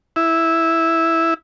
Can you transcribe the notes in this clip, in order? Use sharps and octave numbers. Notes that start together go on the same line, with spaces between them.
E4